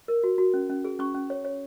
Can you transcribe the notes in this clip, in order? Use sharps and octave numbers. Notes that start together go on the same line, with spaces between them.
A#4
F#4
F#4
C#4
C#4
G#4
C#4 C#6
C#4
C#5
C#5